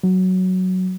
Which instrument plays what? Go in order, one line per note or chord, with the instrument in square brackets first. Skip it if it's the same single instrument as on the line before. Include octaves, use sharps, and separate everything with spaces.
[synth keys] F#3